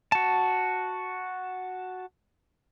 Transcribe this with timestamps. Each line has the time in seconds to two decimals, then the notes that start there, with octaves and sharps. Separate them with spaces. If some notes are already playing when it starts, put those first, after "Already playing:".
0.12 F#4 A5